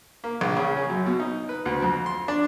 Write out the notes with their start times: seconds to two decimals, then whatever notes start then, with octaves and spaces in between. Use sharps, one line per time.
0.24 A#3
0.41 A#1
0.57 C#3
0.77 C#4
0.90 F#2
1.06 B2
1.20 D#4
1.49 B4
1.65 D2
1.82 F2
2.06 C6
2.28 D4